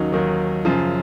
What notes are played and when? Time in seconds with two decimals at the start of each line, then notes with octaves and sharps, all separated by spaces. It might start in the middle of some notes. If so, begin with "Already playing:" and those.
Already playing: D#2 D#3 F#3 C#4 D#4
0.12 D#2 D#3 F#3
0.65 F#2 C#3 F3 F4